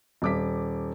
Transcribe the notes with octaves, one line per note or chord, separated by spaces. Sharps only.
D#1 D6 B6